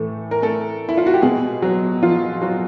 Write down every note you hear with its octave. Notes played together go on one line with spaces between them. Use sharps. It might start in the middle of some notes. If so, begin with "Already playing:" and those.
Already playing: A2 E3 A3 A4
A#4
A3 A4
E4
F4
F#4
G4
B2 G#3 G#4
F#3 F#4
F3 F4
F#3 F#4